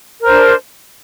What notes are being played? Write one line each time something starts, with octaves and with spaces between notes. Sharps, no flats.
D4 A#4 C5